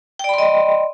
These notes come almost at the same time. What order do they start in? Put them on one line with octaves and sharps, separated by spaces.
G5 D5 B5 C6 D#5